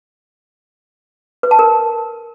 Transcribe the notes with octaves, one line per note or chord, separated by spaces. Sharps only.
B4
A5
A#4